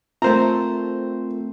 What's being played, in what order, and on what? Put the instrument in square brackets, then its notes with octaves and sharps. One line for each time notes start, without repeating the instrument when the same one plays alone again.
[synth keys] A3 C4 [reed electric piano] F4 A#4 [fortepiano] C5 A#5